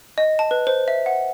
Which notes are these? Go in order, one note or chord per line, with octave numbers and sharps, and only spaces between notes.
D#5
A5
B4
C5
E5
F#5